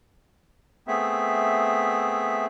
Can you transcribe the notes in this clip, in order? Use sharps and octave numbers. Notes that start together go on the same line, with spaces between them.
A3 B3 C4 G#4 E5